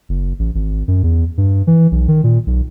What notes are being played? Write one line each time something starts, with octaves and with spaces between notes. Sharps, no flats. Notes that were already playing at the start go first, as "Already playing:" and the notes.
F#1
A1
G#1
F#2
E2
G2
E3
B1
D#3
A#2
B1